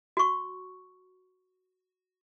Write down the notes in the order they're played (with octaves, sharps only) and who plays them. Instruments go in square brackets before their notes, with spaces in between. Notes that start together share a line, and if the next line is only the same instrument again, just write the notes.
[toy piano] F#4 C#6